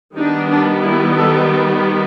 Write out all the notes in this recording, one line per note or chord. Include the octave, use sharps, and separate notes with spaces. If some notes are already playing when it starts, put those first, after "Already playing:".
D#3 G3 B3 D4 D#4
D4
E4
A4